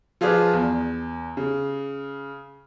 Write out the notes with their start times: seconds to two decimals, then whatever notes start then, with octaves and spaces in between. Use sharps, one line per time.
0.21 F3 F4 G#4 B4 D5
0.53 E2
1.37 C#3